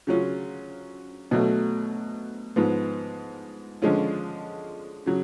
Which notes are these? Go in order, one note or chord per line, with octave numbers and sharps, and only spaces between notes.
C#3 F#3 C#4 F4
B2 F#3 A3
G#2 F3 B3
D3 F3 G#3 C#4 F4
C#3 F#3